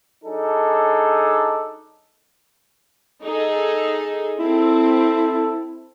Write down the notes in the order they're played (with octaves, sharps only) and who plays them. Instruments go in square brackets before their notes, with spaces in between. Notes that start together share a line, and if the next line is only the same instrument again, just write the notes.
[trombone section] F#3 D4 D#4 G#4 A4
[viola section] D#4 G#4 A4
[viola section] C4 [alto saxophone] E4 [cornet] A4